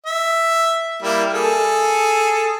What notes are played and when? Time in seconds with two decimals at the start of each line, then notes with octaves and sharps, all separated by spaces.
0.06 E5
1.02 G3 A#3 E4
1.34 G#4 A4